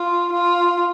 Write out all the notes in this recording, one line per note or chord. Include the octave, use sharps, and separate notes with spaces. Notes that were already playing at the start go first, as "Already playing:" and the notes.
Already playing: F4
F4